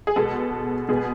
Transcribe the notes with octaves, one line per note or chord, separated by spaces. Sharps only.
G#4
B2 G#3 B3 A4
B2 G#3 B3 G#4